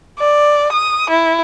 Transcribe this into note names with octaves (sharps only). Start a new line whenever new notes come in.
D5
D#6
E4